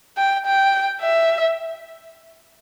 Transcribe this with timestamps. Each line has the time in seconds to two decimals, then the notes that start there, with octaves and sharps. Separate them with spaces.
0.17 G5
0.46 G5
1.02 E5